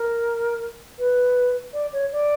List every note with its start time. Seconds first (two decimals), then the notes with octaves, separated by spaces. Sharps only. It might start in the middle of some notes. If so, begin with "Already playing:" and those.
Already playing: A#4
0.98 B4
1.73 D5
1.92 C#5
2.12 D5